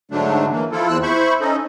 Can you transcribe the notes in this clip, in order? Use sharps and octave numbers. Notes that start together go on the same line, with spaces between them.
G#2 D3 F#3 A3 D4
E3 A#3
F3 E4 F4 A4
E2 C4 E6 F#6
E4 C5 B5 C#6
C#4 D#4 A4 D#5